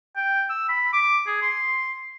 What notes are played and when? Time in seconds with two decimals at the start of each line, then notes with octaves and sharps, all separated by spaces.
0.17 G5
0.50 E6
0.69 B5
0.93 D6
1.27 G#4
1.42 C6